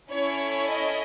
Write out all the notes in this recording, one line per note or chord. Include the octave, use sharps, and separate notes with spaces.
C#4 E4 A4 C#5
D#5